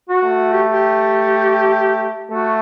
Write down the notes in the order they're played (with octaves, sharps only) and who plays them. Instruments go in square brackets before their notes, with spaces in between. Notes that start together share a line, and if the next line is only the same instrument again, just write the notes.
[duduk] F#4
[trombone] A3
[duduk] G4
G4
[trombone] A3 [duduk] F#4